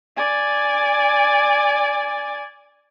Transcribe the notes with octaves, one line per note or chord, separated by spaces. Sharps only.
D5 G#5